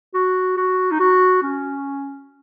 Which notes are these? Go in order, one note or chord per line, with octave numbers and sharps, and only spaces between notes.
F#4
F#4
D#4
F#4
C#4